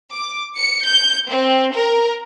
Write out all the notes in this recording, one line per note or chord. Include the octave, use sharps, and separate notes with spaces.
D6
C#7
G6
C4
A#4